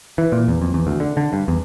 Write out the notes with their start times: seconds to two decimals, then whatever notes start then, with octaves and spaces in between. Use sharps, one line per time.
0.18 E3
0.32 A#2
0.48 E2
0.62 F2
0.74 E2
0.87 D2
1.00 D3
1.17 D3
1.33 G2
1.48 E2